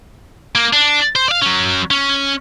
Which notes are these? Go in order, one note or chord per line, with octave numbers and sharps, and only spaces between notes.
A#3
D4
C5
D5 F5
F#3 C#4
C#4